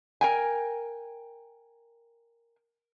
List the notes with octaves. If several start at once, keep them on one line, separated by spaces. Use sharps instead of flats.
A#4 G5 G#5